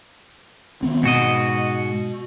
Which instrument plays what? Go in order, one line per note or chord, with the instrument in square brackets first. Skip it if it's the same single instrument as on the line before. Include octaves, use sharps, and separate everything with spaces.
[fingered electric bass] D#3 B3 C4
[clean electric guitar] G#2 F#4 D#5 [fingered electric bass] B2